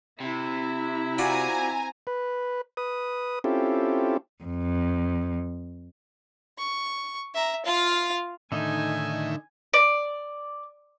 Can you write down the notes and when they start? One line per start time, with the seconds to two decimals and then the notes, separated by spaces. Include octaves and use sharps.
0.20 C3 E4 E5
1.18 C4 F4 F#4 D5 G#5 A#5
2.07 B4
2.77 B4 D#6
3.44 C4 C#4 E4 F4 G4 A4
4.44 F2
6.58 C#6
7.34 E5 A#5
7.65 F4 F5
8.52 A2 D3 D#3 D#4 E5 G#5
9.73 D5